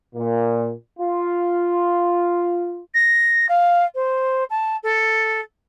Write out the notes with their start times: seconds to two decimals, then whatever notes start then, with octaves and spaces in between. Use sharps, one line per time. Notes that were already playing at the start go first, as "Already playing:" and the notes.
0.15 A#2
0.99 F4
2.94 A#6
3.49 F5
3.95 C5
4.50 A5
4.83 A4